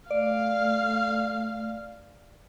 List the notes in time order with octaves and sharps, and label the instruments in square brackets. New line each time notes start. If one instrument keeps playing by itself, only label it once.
[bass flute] A3 [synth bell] D5 [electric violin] F5